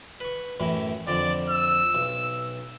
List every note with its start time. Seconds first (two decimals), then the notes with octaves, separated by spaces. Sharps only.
0.21 B4 C#6
0.60 F#2 A2 E3
1.07 F2 D3 D5
1.50 E6
1.95 B1